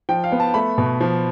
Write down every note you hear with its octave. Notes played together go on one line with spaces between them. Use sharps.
F3 G5
F5
B3
A5
A3 B5
B2
F3